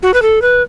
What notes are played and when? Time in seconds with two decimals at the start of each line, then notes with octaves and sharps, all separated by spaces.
0.02 F#4
0.14 B4
0.22 A4
0.42 B4